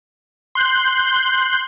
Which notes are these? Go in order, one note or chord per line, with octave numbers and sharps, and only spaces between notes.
C6 F#6 G6